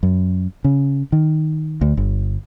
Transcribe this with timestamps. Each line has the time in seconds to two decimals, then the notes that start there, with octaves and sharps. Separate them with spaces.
0.03 F#2
0.64 C#3
1.12 D#3
1.81 D2
1.97 G1